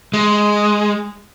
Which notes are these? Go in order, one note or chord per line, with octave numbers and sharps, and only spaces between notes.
G#3